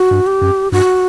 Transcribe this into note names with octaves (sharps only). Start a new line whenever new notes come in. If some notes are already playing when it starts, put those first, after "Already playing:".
Already playing: F#4
G2
G4
F#2
G2 F#4